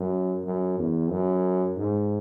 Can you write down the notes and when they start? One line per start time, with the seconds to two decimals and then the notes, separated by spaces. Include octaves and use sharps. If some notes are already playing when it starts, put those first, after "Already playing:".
Already playing: F#2
0.45 F#2
0.78 E2
1.11 F#2
1.77 G#2